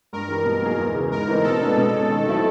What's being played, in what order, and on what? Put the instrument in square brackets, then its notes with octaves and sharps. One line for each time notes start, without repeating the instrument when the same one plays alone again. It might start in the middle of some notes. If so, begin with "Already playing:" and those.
[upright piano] G2 [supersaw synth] A#4
[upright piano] E3 G3
B2
F#3 A#3 D#4 G#4
E2
C#3 E3
[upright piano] G#2 [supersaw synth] A#4
[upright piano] E3 A3 C4 D#4
[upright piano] B2 [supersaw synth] A4
[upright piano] G#3 B3 D4
B2
G#3 C#4
D#3
F#3 A3 C4 E4